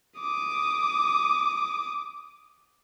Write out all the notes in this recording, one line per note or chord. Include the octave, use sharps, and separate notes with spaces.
D6 D#6